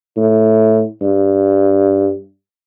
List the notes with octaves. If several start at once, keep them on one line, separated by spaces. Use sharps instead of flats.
A2
G2